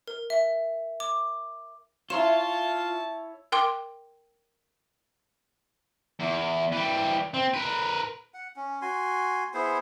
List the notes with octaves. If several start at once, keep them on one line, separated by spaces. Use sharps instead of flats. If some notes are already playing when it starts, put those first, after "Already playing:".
A#4
E5
D6
E4 F4 C#5 A5 A#5 C6 E7
A#4 G5 C6 D6
E2
E3 G3
C4
A#4 B4
F#5
C#4
F#4 G#5 C6
B3 E4 G#4 C5